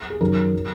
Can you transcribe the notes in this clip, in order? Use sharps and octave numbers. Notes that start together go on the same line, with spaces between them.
G#4
F#2 D#3 F#3 A#4
F#3